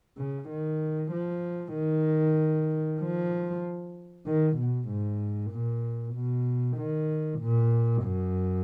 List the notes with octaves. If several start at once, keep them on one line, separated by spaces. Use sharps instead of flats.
C#3
D#3
F3
D#3
F3
D#3
B2
G#2
A#2
B2
D#3
A#2
F#2